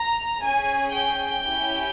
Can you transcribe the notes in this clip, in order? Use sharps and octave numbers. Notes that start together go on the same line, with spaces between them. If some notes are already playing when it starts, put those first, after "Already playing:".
Already playing: A#5
C#4 G#4 G#5
G5
C#4 E4 G4